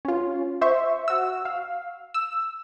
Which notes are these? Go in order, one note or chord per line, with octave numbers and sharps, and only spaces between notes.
C#4 F4
C5 E5 C#6
F#4 E6
F5
E6